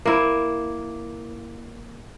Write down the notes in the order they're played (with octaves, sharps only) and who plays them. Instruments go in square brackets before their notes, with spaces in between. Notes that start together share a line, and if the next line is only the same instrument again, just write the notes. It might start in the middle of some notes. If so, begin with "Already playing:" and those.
[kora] A#3 E4